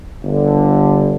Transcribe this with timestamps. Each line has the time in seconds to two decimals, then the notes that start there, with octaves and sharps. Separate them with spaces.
0.23 G1 G2 D3